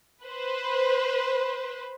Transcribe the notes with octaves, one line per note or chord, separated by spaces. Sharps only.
B4 C5